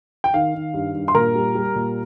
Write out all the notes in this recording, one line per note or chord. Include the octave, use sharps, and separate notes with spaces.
G5
D#3 F5
D#3
G2
G2
C6
A#2 A#4 A#5
G3
G3
A#2